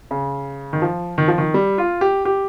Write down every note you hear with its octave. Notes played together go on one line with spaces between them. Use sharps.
C#3
D#3
F3
D#3
F3
D#3
G3
F4
G4
G4